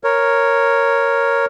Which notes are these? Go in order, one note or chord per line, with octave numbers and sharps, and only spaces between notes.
A#4 C#5